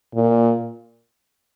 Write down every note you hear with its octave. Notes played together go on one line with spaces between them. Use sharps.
A#2